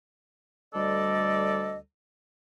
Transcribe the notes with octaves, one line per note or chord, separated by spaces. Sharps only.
D2 G3 A4 D5 D#5